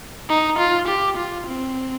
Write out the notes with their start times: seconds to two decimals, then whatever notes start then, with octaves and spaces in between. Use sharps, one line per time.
0.29 D#4
0.58 F4
0.88 G4
1.17 F4
1.47 C4